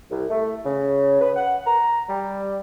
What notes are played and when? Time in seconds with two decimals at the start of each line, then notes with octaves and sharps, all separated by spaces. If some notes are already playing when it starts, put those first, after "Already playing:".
0.10 C2
0.30 A3
0.65 C#3
1.21 B4
1.35 F#5
1.66 A#5
2.09 G3